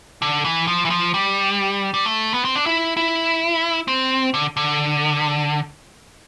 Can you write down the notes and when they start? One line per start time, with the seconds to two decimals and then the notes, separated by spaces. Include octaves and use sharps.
0.22 D3
0.44 E3
0.67 F3
0.85 E3
0.90 F3
1.14 G3
1.94 G3
2.05 A3
2.34 B3
2.45 C4
2.56 D4
2.66 E4
2.97 E4
3.88 C4
4.34 D3
4.57 D3